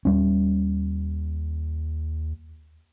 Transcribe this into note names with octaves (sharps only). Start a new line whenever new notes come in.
D#2 G3 C#4